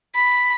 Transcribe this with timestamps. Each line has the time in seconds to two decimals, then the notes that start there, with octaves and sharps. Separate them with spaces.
0.15 B5